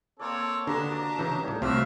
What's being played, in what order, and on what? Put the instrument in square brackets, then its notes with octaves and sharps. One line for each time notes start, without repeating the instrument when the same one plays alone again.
[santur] A#3 D5 [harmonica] C4 A4 C#5
[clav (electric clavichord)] D3 [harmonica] B3 [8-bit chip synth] D4 G4 A5 [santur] A#5
[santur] F#3 D5 [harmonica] A#5
[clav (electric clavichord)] C#3 E3 [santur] D#4
[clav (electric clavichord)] A2 G3 [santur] C#5
[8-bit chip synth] C2 A3 [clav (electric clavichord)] C3 [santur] F3 F#4 B4 [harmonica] E5 F5